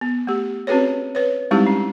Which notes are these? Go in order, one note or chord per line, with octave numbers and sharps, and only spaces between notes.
B3
A3 G4
C4 C#4 F#4 G#4 B4 C#5
B4 C#5
G3 G#3 C4 D#4 E4 G4
C#4